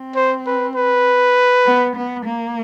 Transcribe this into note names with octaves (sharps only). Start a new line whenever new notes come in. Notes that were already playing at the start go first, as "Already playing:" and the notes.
Already playing: C4
C5
B4
B4
B3
B3
A#3